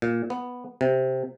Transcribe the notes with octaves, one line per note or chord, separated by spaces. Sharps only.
A#2
B3
C3